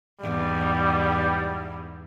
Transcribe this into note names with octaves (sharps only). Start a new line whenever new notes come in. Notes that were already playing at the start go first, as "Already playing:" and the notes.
E2 G#2 G3